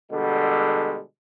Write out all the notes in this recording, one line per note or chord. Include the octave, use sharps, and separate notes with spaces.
B2 D3 G3 G#3 A4